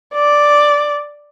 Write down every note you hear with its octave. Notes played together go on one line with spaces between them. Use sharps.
D5